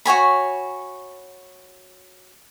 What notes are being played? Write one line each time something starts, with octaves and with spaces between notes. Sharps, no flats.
F#4 C#5 G#5 B5